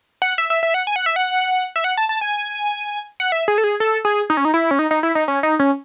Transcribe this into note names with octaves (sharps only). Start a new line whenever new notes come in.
F#5
E5
E5
E5
F#5
G#5
F#5
E5
F#5
E5
F#5
A5
A5
G#5
F#5
E5
G#4
A4
G#4
A4
G#4
D#4
C#4
D#4
E4
C#4
D#4
D#4
E4
D#4
C#4
D#4
C#4